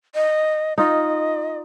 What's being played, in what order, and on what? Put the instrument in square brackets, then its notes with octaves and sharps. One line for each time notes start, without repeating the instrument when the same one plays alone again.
[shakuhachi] D#5
[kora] D#4 F4 [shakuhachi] D#5